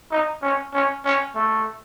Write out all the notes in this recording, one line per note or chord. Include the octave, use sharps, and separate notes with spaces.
D#4
C#4
C#4
C#4
A3